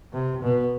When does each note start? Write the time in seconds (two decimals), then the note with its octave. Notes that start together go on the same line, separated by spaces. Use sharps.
0.13 C3
0.43 B2